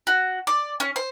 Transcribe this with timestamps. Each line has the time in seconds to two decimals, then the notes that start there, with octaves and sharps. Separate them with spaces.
0.07 F#4
0.47 D5
0.80 C#4
0.96 C5